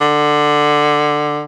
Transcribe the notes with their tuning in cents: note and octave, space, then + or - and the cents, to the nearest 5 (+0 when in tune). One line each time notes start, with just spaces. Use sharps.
D3 +15